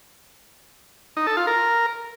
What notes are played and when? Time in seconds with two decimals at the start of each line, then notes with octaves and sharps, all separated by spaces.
1.17 D#4
1.27 A4
1.37 F4
1.47 A#4